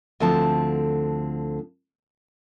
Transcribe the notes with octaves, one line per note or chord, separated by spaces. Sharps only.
D2 D3 F3 C4 A5